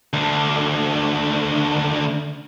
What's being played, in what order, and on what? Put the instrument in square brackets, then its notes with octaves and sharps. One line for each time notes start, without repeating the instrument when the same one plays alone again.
[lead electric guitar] D2 D3